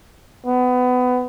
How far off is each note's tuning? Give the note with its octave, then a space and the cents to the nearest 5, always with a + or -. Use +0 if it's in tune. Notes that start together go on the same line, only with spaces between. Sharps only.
B3 +20